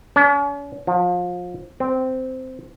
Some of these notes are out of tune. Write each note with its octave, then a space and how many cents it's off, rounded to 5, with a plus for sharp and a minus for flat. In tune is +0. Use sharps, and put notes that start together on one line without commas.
C#4 +45
F3 +30
C4 -10